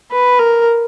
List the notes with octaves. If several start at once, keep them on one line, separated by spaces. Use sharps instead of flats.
B4
A#4